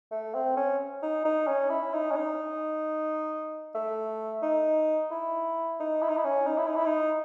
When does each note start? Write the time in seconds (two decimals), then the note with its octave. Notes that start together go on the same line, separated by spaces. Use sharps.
0.11 A3
0.34 C4
0.57 C#4
1.03 D#4
1.25 D#4
1.47 C#4
1.70 E4
1.93 D#4
2.11 C#4
2.16 D#4
3.75 A3
4.42 D#4
5.11 E4
5.80 D#4
6.02 E4
6.09 D#4
6.17 E4
6.24 C#4
6.47 D#4
6.58 E4
6.67 D#4
6.76 E4
6.86 D#4